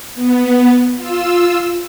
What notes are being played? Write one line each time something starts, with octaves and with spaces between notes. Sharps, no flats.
B3
F4 E6